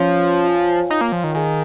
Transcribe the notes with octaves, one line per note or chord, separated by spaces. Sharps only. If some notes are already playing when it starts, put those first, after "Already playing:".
Already playing: F3 C#4 F4 C#5
F4 C#5 F5 G#5
D#4
A#3
F3
D#3
D#3 G#4 F5 G#5